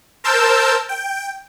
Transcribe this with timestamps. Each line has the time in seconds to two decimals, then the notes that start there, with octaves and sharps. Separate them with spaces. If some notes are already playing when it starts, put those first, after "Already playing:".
0.24 A#4 C5 A5 E6 G6
0.89 G5